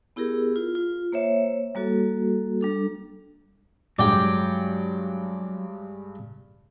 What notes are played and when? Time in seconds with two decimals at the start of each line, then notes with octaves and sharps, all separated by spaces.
0.16 B3 E4 G4 G#4 A#4
0.56 F4
0.75 F4
1.12 A#3 C5 C#5 E5
1.75 G3 A#3 F#4 A4
2.61 G3 D4 A4
3.99 G2 F#3 G#3 D5 G5